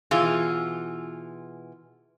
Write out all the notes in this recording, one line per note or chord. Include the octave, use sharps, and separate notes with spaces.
B2 E3 F4 G#4